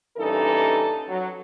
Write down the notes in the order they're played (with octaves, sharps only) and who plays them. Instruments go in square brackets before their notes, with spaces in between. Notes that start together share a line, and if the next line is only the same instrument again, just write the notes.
[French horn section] G2 A#2 E3 C#4 D#4 A4
F#3